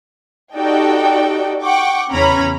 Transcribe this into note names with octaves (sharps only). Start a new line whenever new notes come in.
D#4 F#4 G4 A4 D5 G5
F#5 G5 C#6 D6
E2 C#3 C#4 A#5 B5